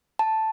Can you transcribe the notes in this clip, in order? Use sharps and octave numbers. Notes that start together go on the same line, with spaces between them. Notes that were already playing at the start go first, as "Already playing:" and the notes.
A5